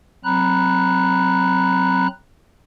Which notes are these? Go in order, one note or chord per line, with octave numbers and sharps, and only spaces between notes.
F#3 C4 A#5 B5 F#6